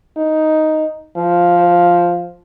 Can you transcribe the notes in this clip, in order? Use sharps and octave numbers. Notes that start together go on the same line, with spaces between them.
D#4
F3